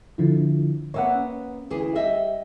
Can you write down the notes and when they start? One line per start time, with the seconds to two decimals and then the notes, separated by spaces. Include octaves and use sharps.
0.18 D3 F3 E4
0.94 A#3 B3 C#5 E5 F#5
1.15 C#4
1.70 D2 E3 G#4
1.95 G3 D#5 E5